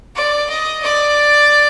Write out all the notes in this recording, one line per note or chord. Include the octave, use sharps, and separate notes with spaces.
D5
D#5
D5